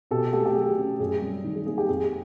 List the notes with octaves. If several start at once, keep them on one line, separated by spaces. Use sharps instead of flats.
B2 G4 A4
A3 G4 A4
G4
F#3 G#4
C#4
F#2 G#4
G3
D#3
G#4
A#3 G#4
G4
F2 G#4